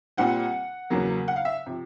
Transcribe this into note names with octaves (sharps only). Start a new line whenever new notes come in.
A#2 G3 C4 F#5
E2 C#3 F#3 A#3
F#5
F5
E5
C3 F3